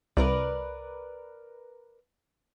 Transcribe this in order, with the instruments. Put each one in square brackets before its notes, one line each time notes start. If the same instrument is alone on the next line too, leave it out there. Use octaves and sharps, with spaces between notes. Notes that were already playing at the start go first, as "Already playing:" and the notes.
[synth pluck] C2 [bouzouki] A#4 B4 D5